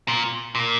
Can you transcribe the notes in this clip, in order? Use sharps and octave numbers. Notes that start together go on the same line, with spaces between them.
A#2
A#2